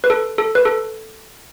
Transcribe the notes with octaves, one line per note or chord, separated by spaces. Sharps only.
B4
A4
A4
B4
A4